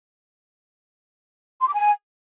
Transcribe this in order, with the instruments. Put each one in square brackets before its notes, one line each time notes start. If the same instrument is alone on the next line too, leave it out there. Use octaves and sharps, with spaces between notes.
[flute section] C6
D6
G#5